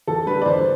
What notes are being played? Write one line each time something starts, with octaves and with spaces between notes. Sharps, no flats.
E2 A4
D3 G3 B4
D5
E2 C5